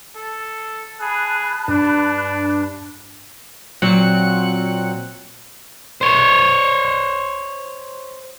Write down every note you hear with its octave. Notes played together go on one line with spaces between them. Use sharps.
A4
G#4 A5 B5 F#6
G2 D4
A#2 F#3 C4 F#6 C#7
C5 C#5